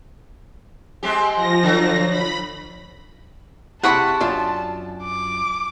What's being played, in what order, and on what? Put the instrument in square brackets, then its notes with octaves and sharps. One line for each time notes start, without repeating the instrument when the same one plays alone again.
[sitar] G#3 C4 G4
[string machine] F3 A#6
[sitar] D3 F#3
[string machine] B5
[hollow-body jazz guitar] C3 E4 G#4 [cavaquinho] F#5 B5 C#6 [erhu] A5
[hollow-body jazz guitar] F#2 D4 F4
[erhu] D6